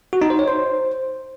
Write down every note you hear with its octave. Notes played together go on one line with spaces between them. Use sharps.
F#4
D#4
C5
C#5
C5